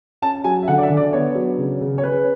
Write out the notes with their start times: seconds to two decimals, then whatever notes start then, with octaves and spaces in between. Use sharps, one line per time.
0.22 C#4 A5
0.44 F#3 G#5
0.63 E5
0.68 D3 F#5
0.78 D5
0.83 E5
0.89 D3
0.97 D5
1.13 B3 C#5
1.35 F#3
1.58 C#3
1.81 C#3
1.98 C#5
2.04 C#4 B4